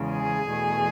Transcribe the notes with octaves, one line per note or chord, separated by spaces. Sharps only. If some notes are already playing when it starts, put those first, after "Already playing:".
Already playing: E2 C#3 G#3
G#4 G#5
E2 B2 A3